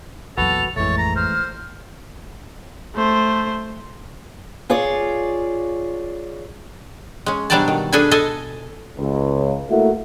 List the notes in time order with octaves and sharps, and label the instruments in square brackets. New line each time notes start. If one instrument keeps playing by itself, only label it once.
[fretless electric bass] A#1 E2 F#3 [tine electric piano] F#4 B4 [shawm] A4 [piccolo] F7
[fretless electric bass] A1 F2 [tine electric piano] E3 G#3 A3 [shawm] C#5 [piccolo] A6
[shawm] A#5
[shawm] C5 [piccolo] F6
[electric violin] A3 C5
[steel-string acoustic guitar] F4 G#4 C#5 D5
[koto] G#3 C#4
B2 F#3 G3 D4 D5 A5
D#3
D4 G#4 A4 B4 G#5
A4 D#5 G#5 A5
[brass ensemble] C#2
A3 A#3 E4 F#4 A4 E5